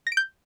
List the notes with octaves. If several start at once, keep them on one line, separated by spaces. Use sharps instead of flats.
A#6
D7
G6